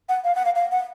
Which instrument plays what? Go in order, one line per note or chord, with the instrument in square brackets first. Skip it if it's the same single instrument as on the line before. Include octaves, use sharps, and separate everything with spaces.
[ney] F#5
F5
F#5
F5
F5
F#5